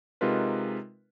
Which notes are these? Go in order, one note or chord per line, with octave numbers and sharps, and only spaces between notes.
C3 G#3 D#4 F4 A#4 B4